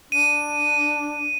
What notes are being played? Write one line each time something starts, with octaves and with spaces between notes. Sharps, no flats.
D4 D#7